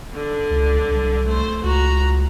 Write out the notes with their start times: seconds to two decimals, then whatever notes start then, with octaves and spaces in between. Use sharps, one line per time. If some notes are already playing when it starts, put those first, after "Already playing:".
0.14 D3 D4
0.51 C#2
0.91 C2
1.26 A3 C5
1.64 C#2 F#4 A#5